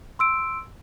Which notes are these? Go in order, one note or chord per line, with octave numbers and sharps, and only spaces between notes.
C6 E6 D7